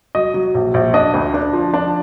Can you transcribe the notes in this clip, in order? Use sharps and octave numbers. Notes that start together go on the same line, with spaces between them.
F#3 D#5
F#3
A#1
A#1
D4 D#5
D2
D4
F3
D4